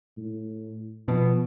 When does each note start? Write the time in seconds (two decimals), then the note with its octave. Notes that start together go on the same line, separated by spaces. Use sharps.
0.17 A2
1.08 B2 F3